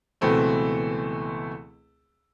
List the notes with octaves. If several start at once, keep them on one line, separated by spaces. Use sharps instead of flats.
C#2 B2 E3 A3 C4